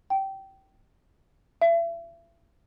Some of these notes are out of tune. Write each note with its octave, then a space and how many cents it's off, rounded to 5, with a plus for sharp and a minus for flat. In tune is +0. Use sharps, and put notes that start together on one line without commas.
G5 -20
E5 +35